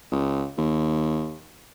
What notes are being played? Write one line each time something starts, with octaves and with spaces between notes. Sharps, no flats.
C#2
D#2